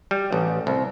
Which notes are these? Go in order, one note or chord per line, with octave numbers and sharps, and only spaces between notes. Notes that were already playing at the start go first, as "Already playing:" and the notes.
G3
A1
C2